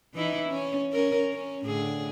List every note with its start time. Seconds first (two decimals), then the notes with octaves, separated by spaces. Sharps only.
0.14 E3 D#4 E4
0.49 C#4
0.92 C#4 A#4
1.32 C#4
1.66 A2 D3 G#4